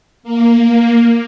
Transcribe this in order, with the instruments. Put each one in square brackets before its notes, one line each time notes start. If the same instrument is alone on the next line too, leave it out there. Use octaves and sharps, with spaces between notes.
[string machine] A#3